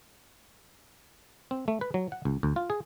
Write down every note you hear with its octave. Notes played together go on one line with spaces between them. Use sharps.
C4
A3
B4
F#3
F#5
C#2
D2
F4
G#4